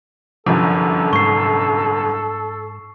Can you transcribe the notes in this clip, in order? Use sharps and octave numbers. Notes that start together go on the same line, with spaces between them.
G1 C2 F#2 F3 A4
G#2 C#6 C7